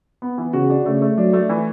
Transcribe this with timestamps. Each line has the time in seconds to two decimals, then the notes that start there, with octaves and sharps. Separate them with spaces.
0.22 B3
0.38 E3
0.53 C#3 F#4
0.70 D4
0.85 C#3 A3
1.02 A3
1.18 F#3 D4
1.33 A3
1.49 E3